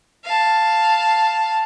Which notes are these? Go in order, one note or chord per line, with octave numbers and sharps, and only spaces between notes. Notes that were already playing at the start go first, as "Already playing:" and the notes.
F5 A5